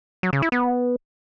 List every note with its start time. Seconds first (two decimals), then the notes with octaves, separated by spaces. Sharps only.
0.23 F#3
0.33 C#3
0.42 E4
0.52 B3